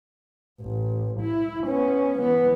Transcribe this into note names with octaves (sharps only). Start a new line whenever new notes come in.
A1
E4
B3 C#4
E3 B3